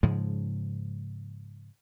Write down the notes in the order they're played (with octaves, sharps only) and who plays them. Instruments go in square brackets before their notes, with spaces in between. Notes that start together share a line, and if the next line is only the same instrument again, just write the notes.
[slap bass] G#2 C#3 F3 G#3